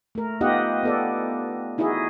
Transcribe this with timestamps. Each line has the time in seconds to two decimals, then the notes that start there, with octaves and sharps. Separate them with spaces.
0.15 A3 A#4
0.41 B3 D#4 F4 G4 D#5 F#5
0.83 B3 A4 D5
1.78 D#4 E4 F#4 G#4 D#5